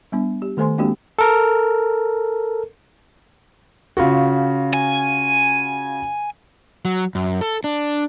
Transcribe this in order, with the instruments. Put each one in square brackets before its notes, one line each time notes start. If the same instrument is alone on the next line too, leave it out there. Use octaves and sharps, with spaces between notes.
[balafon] G3 B3 D4
G4
D#3 A3 A4 C5 G#5 C6
G#3 A#3 C4 D4 F#4 G4
[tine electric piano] A4 A#4
[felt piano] C#3 F4 F#4
[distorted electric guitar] G#5
[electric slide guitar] F#3
F#2
A4
D4